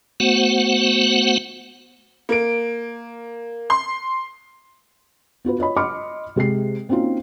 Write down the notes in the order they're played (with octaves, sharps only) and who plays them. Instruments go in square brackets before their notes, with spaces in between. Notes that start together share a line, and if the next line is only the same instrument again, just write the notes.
[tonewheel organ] A3 B3 F#4 C5 F#5
[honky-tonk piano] A#3 D7
C6
[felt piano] B3 F4 F#4 B4
F4 C#5 D#5 B5
D#5 B5 C6 D6 F6 C#7
C3 G#3 G4 C7
A#3 C4 C#4 D#4 F4 F#4